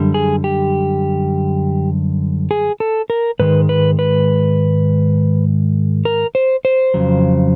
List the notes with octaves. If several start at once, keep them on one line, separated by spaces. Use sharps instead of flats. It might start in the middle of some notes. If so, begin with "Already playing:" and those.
Already playing: F#2 D3 G3
G#4
G4
G#4
A4
A#4
G#2 D#3 G#3 B4
B4
B4
A#4
C5
C5
F2 C#3 F#3